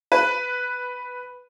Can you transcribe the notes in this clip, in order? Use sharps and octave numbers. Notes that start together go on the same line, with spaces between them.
B4